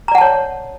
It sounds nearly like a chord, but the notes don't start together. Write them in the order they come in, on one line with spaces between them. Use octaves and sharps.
A#5 D5 F#5 A5 C#5